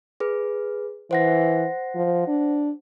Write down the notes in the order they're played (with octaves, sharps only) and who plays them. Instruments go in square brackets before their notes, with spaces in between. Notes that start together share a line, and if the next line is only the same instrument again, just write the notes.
[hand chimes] G#4 B4
[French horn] E3 [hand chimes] C5 F#5 A#6
[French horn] F3
D4